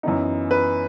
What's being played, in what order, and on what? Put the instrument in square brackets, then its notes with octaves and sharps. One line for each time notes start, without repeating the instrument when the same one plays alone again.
[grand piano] F#2 E3 B3 D#4
B4